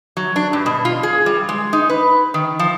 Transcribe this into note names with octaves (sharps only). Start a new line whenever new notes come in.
F#3
D4
G2
B2
F4
G#4
G3
G#3
D#4
B4
D#3
F3